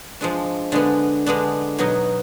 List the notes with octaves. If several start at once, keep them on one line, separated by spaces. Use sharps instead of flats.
F3 G#3 D4
D3 G#3 B3 D4
D3 G#3 B3 D4
B2 F#3 B3 D#4